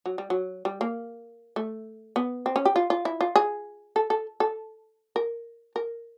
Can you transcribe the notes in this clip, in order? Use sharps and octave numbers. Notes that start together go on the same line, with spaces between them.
F#3
G3
F#3
G3
A#3
A3
B3
C4
C#4
G4
F4
F4
E4
F4
G#4
A4
A4
A4
A#4
A#4